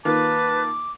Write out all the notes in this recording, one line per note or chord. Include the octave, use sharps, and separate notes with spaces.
D#3 A#3 F4 B4 A5 D6